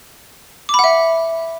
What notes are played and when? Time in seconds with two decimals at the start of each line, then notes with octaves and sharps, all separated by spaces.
0.69 D6
0.74 B5
0.79 F#5
0.84 E5